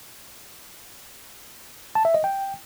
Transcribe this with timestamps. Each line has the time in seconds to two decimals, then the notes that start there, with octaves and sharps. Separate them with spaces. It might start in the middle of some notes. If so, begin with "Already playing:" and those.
1.95 A5
2.05 E5
2.14 D#5
2.24 G5